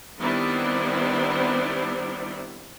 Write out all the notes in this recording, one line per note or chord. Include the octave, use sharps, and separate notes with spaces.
D#3 G3 B3 C4 D4 E4